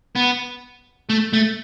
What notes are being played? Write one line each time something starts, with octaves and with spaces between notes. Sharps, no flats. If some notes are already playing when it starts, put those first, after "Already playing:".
B3
A3
A3